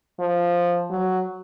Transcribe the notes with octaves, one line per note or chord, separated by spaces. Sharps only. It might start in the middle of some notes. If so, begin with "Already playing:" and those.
F3
F#3